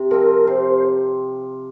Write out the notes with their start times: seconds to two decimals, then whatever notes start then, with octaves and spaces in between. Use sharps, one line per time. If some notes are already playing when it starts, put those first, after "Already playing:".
Already playing: C3
0.11 F3 C4 A#4
0.47 C3 C5